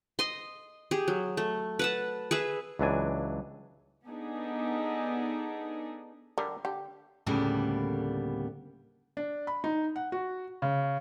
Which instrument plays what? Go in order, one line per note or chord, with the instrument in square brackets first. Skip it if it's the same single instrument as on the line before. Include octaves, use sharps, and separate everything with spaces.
[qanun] D#5 C6
G4 G#4
F#3
A3
B4 F#5 A5
G#4 B4 E5
[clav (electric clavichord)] C#2 E3 F#3 D4 G#5
[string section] B3 D4 D#4 G#4 A4
[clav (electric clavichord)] D3 G3 D4 [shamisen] A#4
[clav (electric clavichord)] D3 [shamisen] G4
[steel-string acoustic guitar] D2 A2 C#3 G3 A#3 B3
[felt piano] D4
B5
D#4
F#5
F#4
C#3